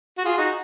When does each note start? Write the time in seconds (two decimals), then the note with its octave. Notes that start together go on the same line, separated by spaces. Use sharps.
0.18 F#4
0.24 F4 G#4
0.37 D#4 F#4